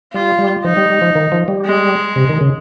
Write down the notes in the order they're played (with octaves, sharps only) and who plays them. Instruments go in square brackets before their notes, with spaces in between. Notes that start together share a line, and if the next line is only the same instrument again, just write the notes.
[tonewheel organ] G3 [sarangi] F4
[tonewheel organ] G3
[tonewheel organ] F3 [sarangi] D#4
[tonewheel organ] G3
G3
F3
D#3
F3
G3
[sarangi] G#3
[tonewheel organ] C3
D#3
C#3